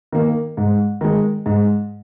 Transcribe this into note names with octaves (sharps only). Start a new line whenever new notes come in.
D#3 A#3
G#2
D#3 G#3
G#2